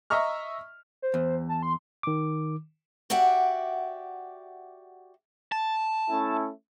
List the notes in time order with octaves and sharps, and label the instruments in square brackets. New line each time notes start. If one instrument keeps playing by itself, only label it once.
[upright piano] D#5 E5 A#5 C#6 F6
[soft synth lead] C5
[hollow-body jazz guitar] E2
[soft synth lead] A5
C6
[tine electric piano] D#3 D6
[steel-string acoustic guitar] F#4 G4 D5 E5 F#5
[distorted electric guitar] A5
[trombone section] A3 C#4 E4